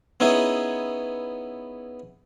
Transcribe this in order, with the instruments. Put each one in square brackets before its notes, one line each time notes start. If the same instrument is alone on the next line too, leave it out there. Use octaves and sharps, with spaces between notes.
[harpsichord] B3 C#4 D#4 E4 G#4